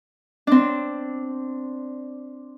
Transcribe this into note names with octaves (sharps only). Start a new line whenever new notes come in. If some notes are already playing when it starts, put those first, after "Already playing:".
C4 D4